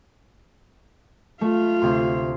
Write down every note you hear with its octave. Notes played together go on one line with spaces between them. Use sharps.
A3 F4 F5
D2 C3 C6